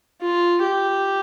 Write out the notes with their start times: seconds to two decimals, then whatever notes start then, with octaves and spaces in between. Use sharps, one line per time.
0.21 F4
0.63 G4